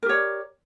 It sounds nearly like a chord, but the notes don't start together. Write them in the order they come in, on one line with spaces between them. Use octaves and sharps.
A#4 G4 C#5 D5